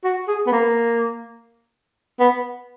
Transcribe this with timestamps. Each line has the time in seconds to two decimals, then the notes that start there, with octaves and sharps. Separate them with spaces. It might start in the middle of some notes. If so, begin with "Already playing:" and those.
0.04 F#4
0.28 G#4
0.47 B3
0.52 A#3
2.20 B3